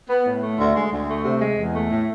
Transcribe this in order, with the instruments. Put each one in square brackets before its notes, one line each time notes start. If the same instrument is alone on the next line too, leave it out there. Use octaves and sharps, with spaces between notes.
[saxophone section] B3
A2
A3
D2
G#3
D2
A3
C3
G#3
E2
A3
A2